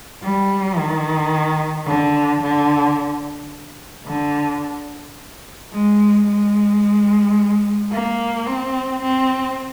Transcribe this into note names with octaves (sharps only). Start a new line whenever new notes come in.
G3
D#3
D3
D3
D3
G#3
G#3
A#3
C4
C4